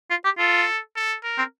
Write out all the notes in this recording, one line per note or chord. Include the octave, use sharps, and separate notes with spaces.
F4
G4
F4 A4
A4
A#4
C4